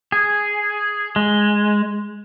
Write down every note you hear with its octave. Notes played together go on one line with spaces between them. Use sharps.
G#4
G#3